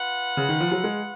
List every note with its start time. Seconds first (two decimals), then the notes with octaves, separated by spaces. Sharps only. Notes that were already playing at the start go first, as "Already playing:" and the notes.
Already playing: F4 B4 F#5
0.37 C#3
0.49 D#3
0.60 F3
0.72 F#3
0.84 G#3